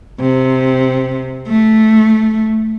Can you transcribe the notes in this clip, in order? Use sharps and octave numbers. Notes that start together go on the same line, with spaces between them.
C3
A3